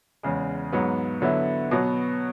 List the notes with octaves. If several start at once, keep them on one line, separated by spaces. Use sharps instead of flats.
E2 C#3 G#3
G#2 F#3 B3
D3 F#3 B3 E4
B2 F#3 B3